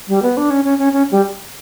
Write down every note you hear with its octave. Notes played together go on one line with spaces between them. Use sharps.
G3
B3
D4
C#4
C#4
C#4
C#4
G3